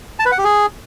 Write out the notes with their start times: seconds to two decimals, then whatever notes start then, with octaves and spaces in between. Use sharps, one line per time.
0.19 A5
0.26 B4
0.32 F#5
0.38 G4
0.44 G#4